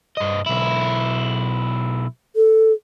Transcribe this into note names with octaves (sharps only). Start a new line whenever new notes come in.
G2 D#5
B1 E4
A4